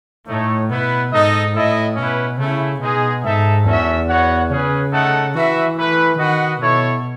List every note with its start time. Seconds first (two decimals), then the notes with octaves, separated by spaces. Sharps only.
0.28 A2 A3 D#4 A4 C#5
0.70 B2 B3 E4 B4
1.12 G#2 D#4 A4 D#5
1.54 A2 E4 A4 D#5
1.96 B2 C#4 E4 B4
2.39 C#3 A3 C#4 E4
2.81 B2 G#3 D#4 G#4
3.23 G#2 D#4 A4 E5
3.66 E2 C#4 F#4 A4 E5
4.08 B3 F#4 C#5 F#5
4.49 C#3 C#4 G#4 B4
4.92 A3 D#4 A4 D#5 F#5
5.35 E3 F#4 B4 E5
5.77 A3 E4 B4
6.19 D#3 F#4 B4 D#5 F#5
6.61 B2 E4 A4 C#5